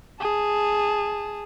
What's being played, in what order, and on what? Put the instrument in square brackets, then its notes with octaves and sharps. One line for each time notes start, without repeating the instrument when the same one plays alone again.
[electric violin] G#4 A5